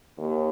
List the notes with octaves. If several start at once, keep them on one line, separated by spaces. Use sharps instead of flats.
D#2